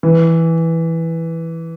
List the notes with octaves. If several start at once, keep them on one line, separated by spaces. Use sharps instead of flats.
E3